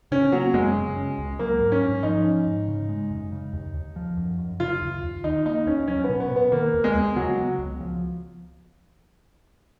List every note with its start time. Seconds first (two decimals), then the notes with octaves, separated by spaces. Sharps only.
0.11 C#3 C#4
0.32 F#3 A#3
0.54 F#2 G#3
0.75 C#3
0.96 C#4
1.18 C#2
1.39 F#3 A#3
1.61 G#2
1.72 C#4
1.83 G#2
2.03 F3 D#4
2.25 C#4
2.47 G#2
2.68 C#3
2.89 G#3
3.11 F#2
3.32 C#3
3.53 D#2
3.74 D#2
3.96 F3
4.17 F#2
4.39 F#2
4.60 C#3 F4
4.82 D#2
5.03 D#2
5.24 D#3 D#4
5.46 A#3 D#4
5.66 D#2 C#4
5.88 F#3 C#4
6.04 B3
6.09 B2
6.20 B3
6.31 B2
6.36 B3
6.52 D#3 A#3
6.74 D#2
6.84 G#3
6.95 D#2
7.16 C#3 F#3
7.38 B3
7.59 C#2
7.81 F3